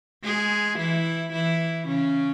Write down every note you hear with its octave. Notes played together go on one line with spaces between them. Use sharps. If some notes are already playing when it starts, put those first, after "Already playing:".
G#3 G#4
E3 E4
E3 E4
C#3 C#4